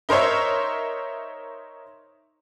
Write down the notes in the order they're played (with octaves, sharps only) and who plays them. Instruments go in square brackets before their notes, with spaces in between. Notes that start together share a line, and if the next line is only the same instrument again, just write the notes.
[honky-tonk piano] D#4 A#4 C5 C#5 E5